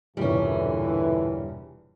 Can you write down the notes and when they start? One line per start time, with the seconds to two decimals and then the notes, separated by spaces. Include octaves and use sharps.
0.17 E1 G2 A#2 D3 E3 G3 C#4